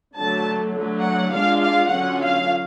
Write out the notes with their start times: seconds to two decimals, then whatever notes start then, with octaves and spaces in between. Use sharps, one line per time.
0.17 D3 F#3 A3 A5
0.75 D3 F#3 A3
1.05 F#5
1.34 G#3 D4 F4 F5
1.63 F5
1.92 D3 F#3 C#4 F4 F#5
2.21 F5